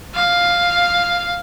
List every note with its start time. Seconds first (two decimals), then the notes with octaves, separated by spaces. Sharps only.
0.14 F5